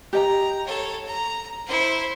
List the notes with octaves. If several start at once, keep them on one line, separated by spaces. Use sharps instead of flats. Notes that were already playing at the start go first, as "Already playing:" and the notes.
G4 D#5 G5 A#5
A4 C#5
A#5
E4 C5